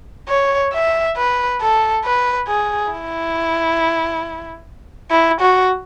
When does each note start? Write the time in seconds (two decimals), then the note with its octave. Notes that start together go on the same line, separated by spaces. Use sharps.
0.28 C#5
0.73 E5
1.17 B4
1.61 A4
2.05 B4
2.48 G#4
2.92 E4
5.11 E4
5.41 F#4